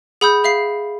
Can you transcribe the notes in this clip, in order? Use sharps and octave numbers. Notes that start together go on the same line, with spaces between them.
G#4 F#5 B5 D#6 E6 G6
G#4 E5 F5 C7